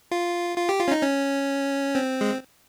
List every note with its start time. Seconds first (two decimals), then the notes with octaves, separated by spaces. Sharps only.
0.12 F4
0.57 F4
0.69 G4
0.80 F4
0.88 C#4
0.91 D#4
1.03 C#4
1.95 C4
2.21 G#3